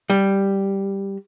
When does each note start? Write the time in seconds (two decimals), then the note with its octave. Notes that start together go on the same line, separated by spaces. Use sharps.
0.10 G3